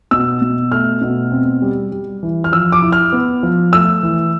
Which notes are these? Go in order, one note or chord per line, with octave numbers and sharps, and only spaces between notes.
B2 E6
B2
A3 F6
B2
C4
G3
G3
E3
F6
F3 E6
D6
E4
F6
B3
F3
A3 E6
E3